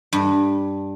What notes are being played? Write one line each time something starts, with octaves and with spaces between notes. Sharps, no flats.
G2